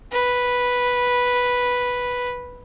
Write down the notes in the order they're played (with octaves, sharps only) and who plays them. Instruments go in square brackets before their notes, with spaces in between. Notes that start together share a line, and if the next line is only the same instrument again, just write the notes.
[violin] B4